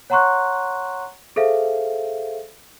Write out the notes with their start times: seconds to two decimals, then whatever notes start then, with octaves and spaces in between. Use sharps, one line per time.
0.10 C#5 F#5 A#5 C6 C#6 F#6
1.36 G#4 A4 C5 E5 F5